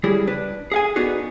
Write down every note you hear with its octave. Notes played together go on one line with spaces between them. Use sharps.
C#2 G3 E4 G#4
D4 B4
G#4 F5 G#5
B3 D4 D#4 F#4 G#4